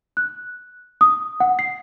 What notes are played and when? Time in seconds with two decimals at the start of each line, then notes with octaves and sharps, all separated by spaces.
0.17 F#6
1.01 D#6
1.40 F#5
1.59 C7